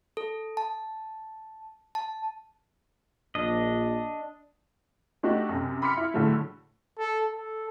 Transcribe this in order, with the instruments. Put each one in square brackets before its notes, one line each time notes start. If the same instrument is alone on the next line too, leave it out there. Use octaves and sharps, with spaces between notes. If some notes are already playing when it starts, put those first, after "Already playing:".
[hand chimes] A4
A5
A5
[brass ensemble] A#1 [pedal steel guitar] D4 D#5
[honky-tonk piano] A3 D4 D#4 F#4 G4
F#2 C3
B5 C6 D6 F6 B6 C#7
E4
A2 D3 F#3 G#3 A3
[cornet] A4
A4